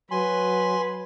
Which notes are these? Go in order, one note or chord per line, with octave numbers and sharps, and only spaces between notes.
F#3 B4 G#5 C6